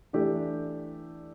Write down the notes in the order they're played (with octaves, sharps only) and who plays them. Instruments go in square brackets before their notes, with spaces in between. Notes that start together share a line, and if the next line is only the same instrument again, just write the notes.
[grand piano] E3 A3 D4 G4 D5